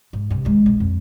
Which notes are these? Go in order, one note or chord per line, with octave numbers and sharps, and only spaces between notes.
G#2
G2 C3
D#2 G#3
A#1
F2